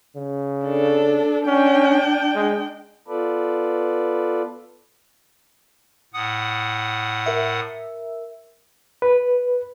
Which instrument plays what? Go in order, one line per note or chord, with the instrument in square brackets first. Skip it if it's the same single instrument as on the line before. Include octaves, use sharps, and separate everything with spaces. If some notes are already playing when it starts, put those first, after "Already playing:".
[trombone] C#3
[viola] D4 A4
[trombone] C#4 [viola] D4 G5
[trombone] G#3
[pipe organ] B3 F4 A4 B4 D5
A2 F#5 D#6
[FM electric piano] A#4 E5
[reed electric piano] B4